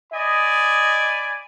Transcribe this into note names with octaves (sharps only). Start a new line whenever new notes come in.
D5 D#5 G#5 B5